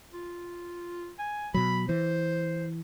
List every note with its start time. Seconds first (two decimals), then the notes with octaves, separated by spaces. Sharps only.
0.13 F4
1.19 G#5
1.54 B2 F#3 B5
1.89 E3 C5